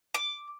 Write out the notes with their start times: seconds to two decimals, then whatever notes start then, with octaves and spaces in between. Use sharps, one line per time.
0.14 D6